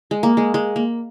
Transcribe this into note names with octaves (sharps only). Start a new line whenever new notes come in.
G#3
A#3
G#3
G#3
A#3